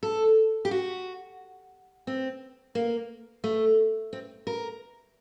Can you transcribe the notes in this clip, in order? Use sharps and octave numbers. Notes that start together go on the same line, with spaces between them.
A4
G4
F#4
C4
A#3
A3
C4
A#4